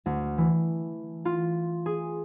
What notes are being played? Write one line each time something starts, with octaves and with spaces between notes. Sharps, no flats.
D2
E3
F4
G#4